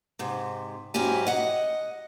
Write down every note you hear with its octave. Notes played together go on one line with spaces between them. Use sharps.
G#2 C3
G#2 F#3 C#4 E4 G4 G#5
D#5 F#5